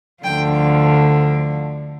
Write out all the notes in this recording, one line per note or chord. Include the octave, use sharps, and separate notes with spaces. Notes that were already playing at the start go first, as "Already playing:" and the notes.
D2 D3 F3 G5